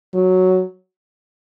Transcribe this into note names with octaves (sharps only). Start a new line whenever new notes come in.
F#3